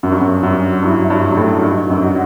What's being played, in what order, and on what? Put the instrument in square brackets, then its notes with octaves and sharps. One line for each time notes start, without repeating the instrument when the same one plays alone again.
[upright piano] F#2 [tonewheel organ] F#3
[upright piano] G2
F#2
[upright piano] F#2 [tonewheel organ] F#3
[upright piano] G2 [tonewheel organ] E4
[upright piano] G2
[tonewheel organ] F#3
[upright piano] G2
A2
[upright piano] G2 [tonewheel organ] D#4
[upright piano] F#2
[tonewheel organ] F#4